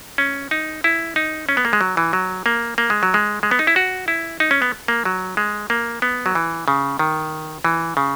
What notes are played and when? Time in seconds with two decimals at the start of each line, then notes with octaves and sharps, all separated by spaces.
0.18 C#4
0.51 D#4
0.84 E4
1.16 D#4
1.49 C#4
1.57 B3
1.65 A#3
1.73 G#3
1.81 F#3
1.97 E3
2.13 F#3
2.46 A#3
2.78 A#3
2.90 G#3
3.03 F#3
3.14 G#3
3.43 G#3
3.51 B3
3.59 D#4
3.67 E4
3.76 F#4
4.08 E4
4.40 D#4
4.51 C#4
4.62 B3
4.88 A#3
5.05 F#3
5.37 G#3
5.70 A#3
6.02 B3
6.26 F#3
6.35 E3
6.68 C#3
6.99 D#3
7.65 E3
7.97 C#3